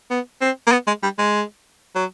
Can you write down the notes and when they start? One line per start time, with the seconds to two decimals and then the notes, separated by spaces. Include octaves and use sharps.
0.10 B3
0.41 C4
0.67 A#3
0.72 B3
0.87 G#3
1.03 G3
1.18 G#3
1.95 F#3